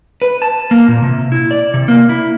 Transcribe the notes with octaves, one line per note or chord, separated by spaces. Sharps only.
B4
A5
A#3
A#2
C3
E4
D5
C3
A#3
E4